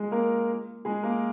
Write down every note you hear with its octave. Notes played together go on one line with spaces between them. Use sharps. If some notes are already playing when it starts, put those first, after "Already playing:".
Already playing: G#3 G#4
A#3 A#4
G#3 G#4
A#3 A#4